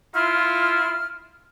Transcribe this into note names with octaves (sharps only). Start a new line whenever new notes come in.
E4 F4 F6